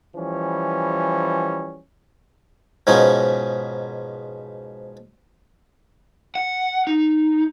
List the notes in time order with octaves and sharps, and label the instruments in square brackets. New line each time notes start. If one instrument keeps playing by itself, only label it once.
[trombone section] E3 F3 G3 C#4
[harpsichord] G#2 B2 F3 C#4 D#4
[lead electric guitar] F#5
D#4